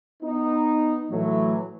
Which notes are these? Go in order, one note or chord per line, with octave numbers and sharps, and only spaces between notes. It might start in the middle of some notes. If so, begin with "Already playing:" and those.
B3 D#4
A2 E3 F#3 A3